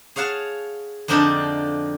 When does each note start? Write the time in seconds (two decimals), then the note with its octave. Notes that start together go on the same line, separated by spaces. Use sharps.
0.16 G#4 C#5 F5 F#5 A5
1.08 F2 D3 F3 D4 D#4